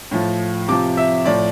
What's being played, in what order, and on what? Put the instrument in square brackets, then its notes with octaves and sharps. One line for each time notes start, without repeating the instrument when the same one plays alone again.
[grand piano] A2 F3
C3 F3 D6
E5
A2 F3 D5